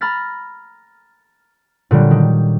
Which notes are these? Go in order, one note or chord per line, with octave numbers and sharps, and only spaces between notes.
A#5 B5 F6 A6 B6
A#2 D3 F#3 G3
D#3